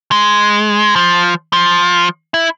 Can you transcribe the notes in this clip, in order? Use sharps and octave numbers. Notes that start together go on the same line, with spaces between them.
G#3
F3
F3
E4